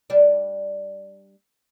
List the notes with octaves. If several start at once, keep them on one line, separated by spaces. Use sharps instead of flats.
G3 D4